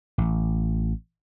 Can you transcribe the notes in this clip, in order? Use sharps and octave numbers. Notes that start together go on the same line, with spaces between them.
A1